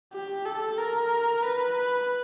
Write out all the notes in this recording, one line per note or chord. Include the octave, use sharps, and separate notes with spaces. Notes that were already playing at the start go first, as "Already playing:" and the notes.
G4
A4
A#4
B4